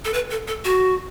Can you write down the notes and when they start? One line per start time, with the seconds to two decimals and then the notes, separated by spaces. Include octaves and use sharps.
0.05 A4
0.14 B4
0.31 A4
0.48 A4
0.64 F#4